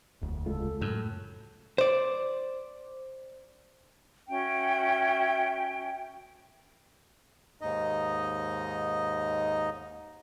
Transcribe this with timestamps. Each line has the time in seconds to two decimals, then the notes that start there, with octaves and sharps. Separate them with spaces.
0.22 E1 D2
0.46 C#3 G#3 F4 A4
0.81 F#2 A2
1.78 C5 D5
4.29 C#4 F#4 E5 G5
7.61 D#2 G#2 D#4 D#5